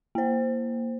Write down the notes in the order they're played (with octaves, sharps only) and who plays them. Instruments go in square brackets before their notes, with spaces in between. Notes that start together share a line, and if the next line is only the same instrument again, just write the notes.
[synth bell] A#3 C5